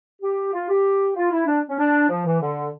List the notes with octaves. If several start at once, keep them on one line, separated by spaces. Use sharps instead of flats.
G4
F4
G4
F4
E4
D4
C#4
D4
F3
E3
D3